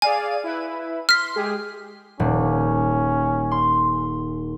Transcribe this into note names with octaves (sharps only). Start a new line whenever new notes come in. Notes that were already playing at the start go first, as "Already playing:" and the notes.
G#4 D5 F5 G#5
E4 B4
C6 F6 B6
G#3 G4 G#4
D#1 C#4
C6